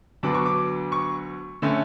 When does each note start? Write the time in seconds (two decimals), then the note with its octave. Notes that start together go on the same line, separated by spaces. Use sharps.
0.23 D2 D3 F#3 B3 D4 D6
0.35 C#6
0.46 D6
0.92 C#6
1.62 D3 A3 C#4